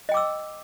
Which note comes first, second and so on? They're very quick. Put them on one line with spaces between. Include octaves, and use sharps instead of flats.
D#5 G5 D6 E6